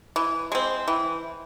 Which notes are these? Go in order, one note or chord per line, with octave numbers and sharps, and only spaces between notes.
E3
G#3 C4
E3